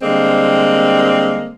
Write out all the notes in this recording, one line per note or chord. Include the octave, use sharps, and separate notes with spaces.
D3 G3 G#3 A#3 C4